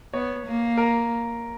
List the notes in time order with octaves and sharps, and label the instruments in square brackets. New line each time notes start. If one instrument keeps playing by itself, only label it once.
[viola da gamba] B3 [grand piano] C#5
[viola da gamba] A#3
[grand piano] A#4